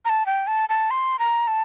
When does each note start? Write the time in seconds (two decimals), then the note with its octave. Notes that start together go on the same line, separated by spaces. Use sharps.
0.05 A#5
0.09 A5
0.26 G5
0.47 A5
0.69 A5
0.91 C6
1.19 A#5
1.48 A5